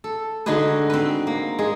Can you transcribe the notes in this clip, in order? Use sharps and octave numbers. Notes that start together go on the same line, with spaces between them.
A4
D3 G#3 D#4 F#4 G#4 B4
C4 B4
A#3
G#3 G#4